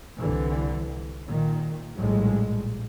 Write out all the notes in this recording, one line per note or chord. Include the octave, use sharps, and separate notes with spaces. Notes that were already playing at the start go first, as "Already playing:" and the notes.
C2 D3 E3
A#2 D#3
A#1 A2 G3 G#3